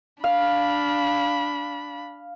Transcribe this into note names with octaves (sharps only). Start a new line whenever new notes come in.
D4 F5 B5